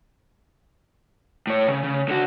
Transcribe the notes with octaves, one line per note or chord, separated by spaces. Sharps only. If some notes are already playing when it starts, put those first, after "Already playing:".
A2 C#5
C#3
C#3
D3 F#4